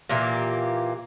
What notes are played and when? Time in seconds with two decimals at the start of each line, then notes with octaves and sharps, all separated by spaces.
0.09 A#2 E3 A#3 G4